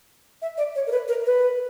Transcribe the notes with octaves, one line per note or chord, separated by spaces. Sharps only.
E5
D5
C#5
A#4
B4
A#4
B4